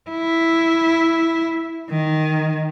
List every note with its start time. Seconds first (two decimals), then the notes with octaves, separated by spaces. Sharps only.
0.11 E4
1.90 D#3